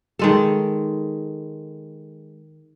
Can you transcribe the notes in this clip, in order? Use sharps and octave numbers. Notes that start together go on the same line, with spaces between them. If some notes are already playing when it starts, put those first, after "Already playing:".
D#3 G#3 A4